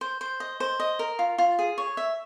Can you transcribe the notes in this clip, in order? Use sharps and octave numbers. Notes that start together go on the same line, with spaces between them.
C5
C5
D#5
C5
D#5
A#4
F4
F4
G#4
C#5
E5